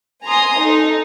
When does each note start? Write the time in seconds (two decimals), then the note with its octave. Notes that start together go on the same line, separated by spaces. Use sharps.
0.24 G#5 A#5 C6 D#6
0.61 D#4 A4